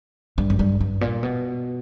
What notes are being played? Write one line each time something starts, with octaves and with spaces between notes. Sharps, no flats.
G2
F#2
G2
G2
A#2
B2